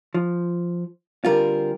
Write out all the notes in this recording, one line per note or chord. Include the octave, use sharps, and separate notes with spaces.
F3
D3 G3 C4 F4 G#4 A#4